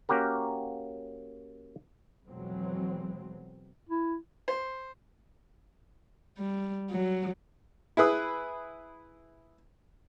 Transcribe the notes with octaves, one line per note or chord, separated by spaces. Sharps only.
A#3 C#4 F#4 G4 A#4
F2 B2 E3 F#3 G#3 C4
E4
C5
G3
F#3
E4 G#4 B4 D#6